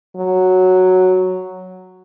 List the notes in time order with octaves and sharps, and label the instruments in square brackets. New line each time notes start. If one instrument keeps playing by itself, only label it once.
[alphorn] F#3